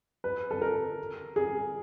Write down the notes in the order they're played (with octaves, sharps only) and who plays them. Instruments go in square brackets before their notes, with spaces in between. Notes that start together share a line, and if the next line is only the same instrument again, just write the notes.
[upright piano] B4
A4
A#4
G#4